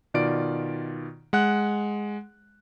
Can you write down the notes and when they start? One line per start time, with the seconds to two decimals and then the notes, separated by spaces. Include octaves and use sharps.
0.14 B2 D#3 F4 D5 D7
1.33 G#3 F#5 F#6